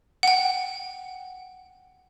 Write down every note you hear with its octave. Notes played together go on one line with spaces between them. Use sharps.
F#5 G5